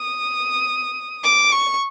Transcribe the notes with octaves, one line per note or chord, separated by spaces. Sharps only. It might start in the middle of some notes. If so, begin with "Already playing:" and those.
Already playing: D#6
D6
C#6